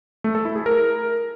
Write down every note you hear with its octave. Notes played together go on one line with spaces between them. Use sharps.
A3
A4
E4
G#4
A#4